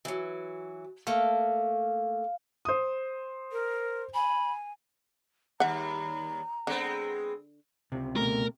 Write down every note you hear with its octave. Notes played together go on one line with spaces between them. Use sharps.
E3 F#3
A3 A#3 F5
C5 D#6
A#4
G#5 B5
D#2 G3 E5 F#5 A#5
D3 G#3 B3 C4
C#2 C3
B2 A3 A#4